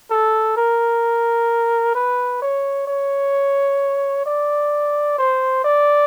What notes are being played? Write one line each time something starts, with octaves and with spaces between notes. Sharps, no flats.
A4
A#4
B4
C#5
C#5
D5
C5
D5